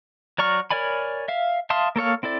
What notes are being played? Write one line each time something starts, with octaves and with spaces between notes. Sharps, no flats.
F#3 D5 A#5 C#6 F6
A#4 C#5 D5 G#5 B5
E5 F5
E5 F5 A5 C6 D#6
A#3 A4 C#5 F5
C4 E4 A4 D5